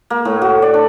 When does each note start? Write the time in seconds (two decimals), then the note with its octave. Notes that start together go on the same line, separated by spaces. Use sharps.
0.10 A#3
0.25 A2
0.42 F#4
0.62 D5
0.74 D4